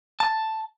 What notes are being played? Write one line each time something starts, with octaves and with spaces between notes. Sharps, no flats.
A5